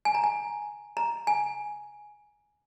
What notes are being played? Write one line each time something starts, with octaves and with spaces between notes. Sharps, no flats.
G#5
A#5
G#5
A#5
G#5